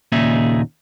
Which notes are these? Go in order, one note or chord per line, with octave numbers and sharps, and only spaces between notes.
D#2 A#2 C#3 D#4 G#4 E5